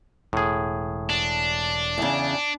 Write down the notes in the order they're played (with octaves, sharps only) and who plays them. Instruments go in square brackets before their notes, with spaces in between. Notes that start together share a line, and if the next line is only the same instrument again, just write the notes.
[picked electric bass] E1 [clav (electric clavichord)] A2 G#4
[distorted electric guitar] D4
[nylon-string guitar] E2 C#3